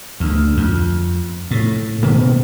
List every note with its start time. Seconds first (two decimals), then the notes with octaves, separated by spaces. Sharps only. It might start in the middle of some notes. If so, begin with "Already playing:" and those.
0.20 D2
0.57 F2
1.51 A2
2.03 B2 D#3 A#3 B3